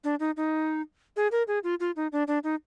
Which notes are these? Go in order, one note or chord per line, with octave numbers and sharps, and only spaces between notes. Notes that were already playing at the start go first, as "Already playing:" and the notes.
D4
D#4
D#4
G#4
A#4
G#4
F4
F4
D#4
D4
D4
D#4